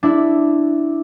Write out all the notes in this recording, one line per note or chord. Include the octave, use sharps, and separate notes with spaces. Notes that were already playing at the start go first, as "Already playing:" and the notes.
D4 E4